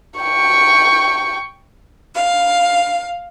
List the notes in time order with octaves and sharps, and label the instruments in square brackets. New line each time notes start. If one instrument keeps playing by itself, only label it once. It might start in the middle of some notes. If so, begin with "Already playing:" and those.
[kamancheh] G5 C#6
[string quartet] F5